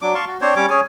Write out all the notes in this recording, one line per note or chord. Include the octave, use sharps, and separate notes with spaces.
F#3 D4 D6
F5 A5 C6 C#6
F#4
C4 D4 C5 C#5
G3 C#4 C#5 D6
C#4 G#4 C#5 G#5